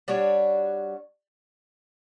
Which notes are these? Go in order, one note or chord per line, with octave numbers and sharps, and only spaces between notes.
G3 D4 F#4 C#5